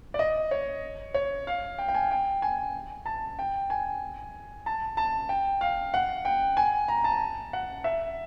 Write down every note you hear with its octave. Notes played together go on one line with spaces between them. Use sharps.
D5
D#5
C#5
C#5
F5
G5
G5
G#5
G5
G#5
A5
G5
G#5
A5
A5
G5
F5
F#5
G5
G#5
A#5
A5
F#5
E5